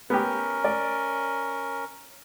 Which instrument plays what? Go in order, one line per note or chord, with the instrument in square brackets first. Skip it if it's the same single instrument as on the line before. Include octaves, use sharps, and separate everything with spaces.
[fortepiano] B3 G4 [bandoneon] C#4 A#4
[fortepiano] D5